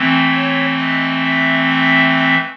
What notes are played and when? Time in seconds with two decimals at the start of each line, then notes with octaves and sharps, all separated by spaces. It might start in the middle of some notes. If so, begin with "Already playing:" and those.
Already playing: E3 A3 C4
0.32 C#5
0.78 D#5
1.24 E5
1.69 E5
2.16 E5